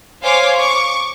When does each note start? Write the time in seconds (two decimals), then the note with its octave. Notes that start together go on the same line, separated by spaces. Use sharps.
0.22 C5 C#5 F5 G#5 D6
0.56 C#6 D6